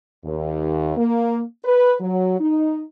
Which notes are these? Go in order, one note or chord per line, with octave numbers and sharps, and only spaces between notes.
D#2
A#3
B4
F#3
D#4